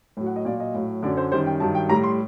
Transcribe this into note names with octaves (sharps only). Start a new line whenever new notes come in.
A2 F#3
F#5
D#5
A#2 F#3 D5
D#5
A2 F#3
F#2 D3 F#3 D5
C5
F#2 D#3 G3 C5
G5
G2 D#3 F#3 A5
G5
A2 G3 A#5
C6